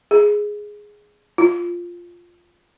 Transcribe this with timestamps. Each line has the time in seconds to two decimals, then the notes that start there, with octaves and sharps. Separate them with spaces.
0.11 G#4
1.38 F4